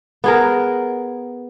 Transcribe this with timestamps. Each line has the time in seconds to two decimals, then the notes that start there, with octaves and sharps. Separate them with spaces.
0.24 B3 G#4 A#4